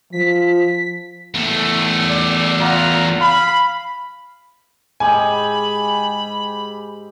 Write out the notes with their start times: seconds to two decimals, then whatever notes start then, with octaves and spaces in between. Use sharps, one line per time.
0.13 F3 B6
1.35 E2 A3
2.10 D5
2.60 F4 F#5 A#5
3.20 F5 B5
5.00 G#2 G4 D#5 G#5 B5